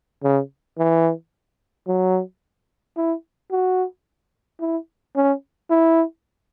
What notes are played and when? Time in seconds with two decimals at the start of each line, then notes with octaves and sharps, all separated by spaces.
0.23 C#3
0.78 E3
1.87 F#3
2.97 E4
3.51 F#4
4.60 E4
5.16 C#4
5.70 E4